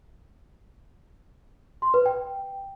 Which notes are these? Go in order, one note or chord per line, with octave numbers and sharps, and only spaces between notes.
C6
B4
G5